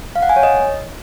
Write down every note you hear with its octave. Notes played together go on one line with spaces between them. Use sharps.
F5
F#5
G#5
C#5
D#5